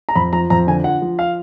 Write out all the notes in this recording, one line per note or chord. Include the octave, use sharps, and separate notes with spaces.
A#5
F2 B5
F3 A#5
F2 A#5
D3 G#5
F3 F#5
F3
F5